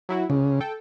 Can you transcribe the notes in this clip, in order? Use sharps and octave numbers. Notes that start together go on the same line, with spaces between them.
F#3 E4 F#4
C#2 C#3
A4 G5